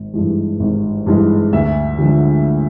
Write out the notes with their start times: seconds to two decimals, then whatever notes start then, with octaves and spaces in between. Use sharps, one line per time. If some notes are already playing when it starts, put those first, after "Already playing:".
Already playing: G#1
0.13 G2 E3 G#3
0.60 G#1
1.06 G2 E3 G#3
1.53 D2 E5
1.99 D3 F3 G#3